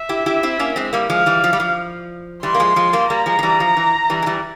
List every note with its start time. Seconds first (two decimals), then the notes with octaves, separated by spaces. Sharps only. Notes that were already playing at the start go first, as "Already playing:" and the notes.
Already playing: E5
0.09 E4 G4
0.26 E4 G4
0.43 C4 E4
0.59 A#3 C#4
0.76 G#3 C4
0.93 G3 A#3
1.10 F3 G#3 F5
1.26 E3 G3
1.44 F3
1.53 G3
1.60 F3
2.43 E3 G3 C6
2.55 A#3
2.60 F3 G#3
2.76 F3 G#3
2.93 G3 A#3
3.10 G3 A#3 A#5
3.26 F3 G#3
3.39 F3
3.43 E3 G3
3.60 F3
3.77 E3
4.10 E3 G3
4.22 G#3
4.26 E3 G3